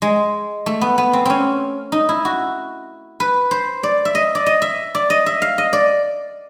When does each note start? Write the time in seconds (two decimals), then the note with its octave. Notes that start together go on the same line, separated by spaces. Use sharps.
0.02 G#3
0.66 A3
0.81 B3
0.98 B3
1.13 C4
1.25 C4 C#4
1.92 D#4
2.09 E4
2.25 F#4
3.20 B4
3.51 C5
3.83 D5
4.05 E5
4.15 D#5
4.35 D5
4.46 D#5
4.62 E5
4.95 D5
5.10 D#5
5.26 E5
5.42 F5
5.58 D#5
5.73 D5